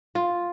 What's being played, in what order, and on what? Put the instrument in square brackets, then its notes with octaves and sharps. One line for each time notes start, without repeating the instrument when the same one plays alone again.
[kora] F4